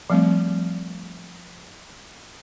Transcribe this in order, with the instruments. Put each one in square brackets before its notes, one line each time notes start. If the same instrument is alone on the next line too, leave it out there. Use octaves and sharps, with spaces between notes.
[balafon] F3 G3 A3 C4